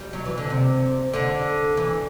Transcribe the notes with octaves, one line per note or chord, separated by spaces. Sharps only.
G3
F#3
E3
D3
C3
D3
E3